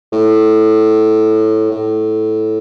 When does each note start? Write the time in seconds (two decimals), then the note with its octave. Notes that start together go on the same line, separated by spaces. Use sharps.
0.13 A2
1.71 A2